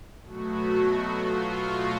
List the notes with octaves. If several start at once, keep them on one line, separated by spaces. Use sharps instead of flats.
B2 F#3 A3 F#4
F4
F#4